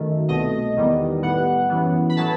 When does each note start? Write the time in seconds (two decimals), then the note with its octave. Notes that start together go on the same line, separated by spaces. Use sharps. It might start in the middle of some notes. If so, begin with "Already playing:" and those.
Already playing: F#2 D#3 A3
0.28 C2 B2 A3 D#5
0.76 E2 D#3 G3 B3
1.22 A2 G3 B3 F#5
1.70 F#2 E3 B3
2.09 B5
2.16 A2 F#3 B3 A5